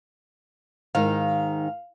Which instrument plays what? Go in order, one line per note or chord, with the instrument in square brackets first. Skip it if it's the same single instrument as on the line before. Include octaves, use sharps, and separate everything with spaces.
[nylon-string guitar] G#2 D#3 [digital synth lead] F5